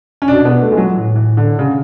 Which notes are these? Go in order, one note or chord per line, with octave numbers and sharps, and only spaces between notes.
C#4
B2 D4
B3
A3
G#3
F#3
A2 E3
E3
D3
C#3